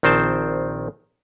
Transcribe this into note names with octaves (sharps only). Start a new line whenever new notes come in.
A#1 D#3 C4 C5 A5